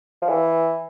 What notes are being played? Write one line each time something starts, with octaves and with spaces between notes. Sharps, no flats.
F3
E3